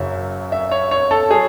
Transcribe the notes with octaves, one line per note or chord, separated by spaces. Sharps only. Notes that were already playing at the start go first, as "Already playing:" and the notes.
Already playing: F#1 F#2 C#3 F#3 E5
E5
C#5
C#5
A4
F#3 G#4